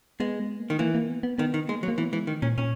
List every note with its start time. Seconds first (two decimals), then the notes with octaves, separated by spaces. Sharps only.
0.20 G#3 B3
0.40 G#3
0.60 A#3
0.70 D#3
0.79 E3 A#3
0.94 A#3
1.09 B3
1.23 B3
1.38 D#3 B3
1.54 D#3
1.68 G#3 A#3
1.83 F#3
1.88 A#3
1.98 E3 B3
2.12 E3 G#3
2.27 D#3
2.42 A#2 C#4
2.58 A#2 C#4